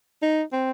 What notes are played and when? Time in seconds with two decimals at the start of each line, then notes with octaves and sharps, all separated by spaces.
0.22 D#4
0.52 C4